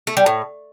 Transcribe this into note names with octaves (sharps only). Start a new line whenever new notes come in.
A3
G3
A2